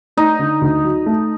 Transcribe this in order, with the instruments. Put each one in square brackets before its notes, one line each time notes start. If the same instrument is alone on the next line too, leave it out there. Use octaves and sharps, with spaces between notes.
[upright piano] A3 [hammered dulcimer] D#4
[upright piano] D3
D2
F#3
A3